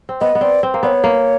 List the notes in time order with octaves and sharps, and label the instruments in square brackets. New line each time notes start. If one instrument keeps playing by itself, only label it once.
[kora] C4
[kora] B3 [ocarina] D#5
[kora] B3
[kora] C4 [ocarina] D5
[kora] C4
A#3
[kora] B3 [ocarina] D5
[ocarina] C#5
[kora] A#3